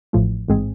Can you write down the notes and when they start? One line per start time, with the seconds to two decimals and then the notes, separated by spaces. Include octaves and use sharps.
0.13 A1 A2 F3 A3
0.48 A1 G#2 G#3 C4 G#4